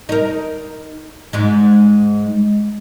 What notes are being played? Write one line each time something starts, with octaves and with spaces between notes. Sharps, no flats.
D#4 A#4
G#2 G#3